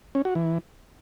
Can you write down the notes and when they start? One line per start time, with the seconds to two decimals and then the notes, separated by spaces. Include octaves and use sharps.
0.15 C#4
0.25 F#4
0.35 E3